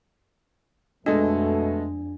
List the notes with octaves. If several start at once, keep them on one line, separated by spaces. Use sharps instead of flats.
F2 B2 G#3 A3 D4 A4 D#5